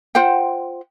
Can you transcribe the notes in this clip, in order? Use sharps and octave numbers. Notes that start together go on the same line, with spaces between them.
F4 C5 F#5 G5